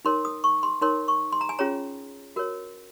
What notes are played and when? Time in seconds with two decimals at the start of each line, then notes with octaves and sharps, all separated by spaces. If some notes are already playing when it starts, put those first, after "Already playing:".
0.05 D#4 A#4 C#5 C6
0.25 D#6
0.44 C#6
0.63 C6
0.81 D#4 A#4 C#5 C6
1.08 C#6
1.32 C6
1.41 A#5
1.49 G#5
1.59 C#4 F4 G#4 C#5 A#5
2.36 F#4 A#4 C#5